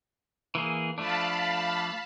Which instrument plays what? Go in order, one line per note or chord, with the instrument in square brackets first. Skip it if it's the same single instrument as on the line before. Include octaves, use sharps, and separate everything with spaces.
[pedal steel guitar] E3 A#3 G#4
[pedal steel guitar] F3 A3 D4 [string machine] F5 A5 B5